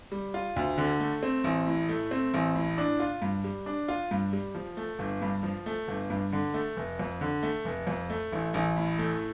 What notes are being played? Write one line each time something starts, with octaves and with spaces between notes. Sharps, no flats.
G3
F4
D2
D3
A3
C4
A1
A2
A3
C4
A1
A2
D4
F4
G2
G3
D4
F4
G2
G3
F3
A3
G1
G2
F3
A3
G1
G2
D3
A3
F1
F2
D3
A3
F1
F2
A3
A1
A1
A2
A3